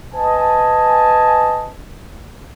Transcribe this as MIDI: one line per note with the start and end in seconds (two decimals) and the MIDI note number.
0.14 1.70 71
0.14 1.70 75
0.14 1.70 80
0.14 1.70 81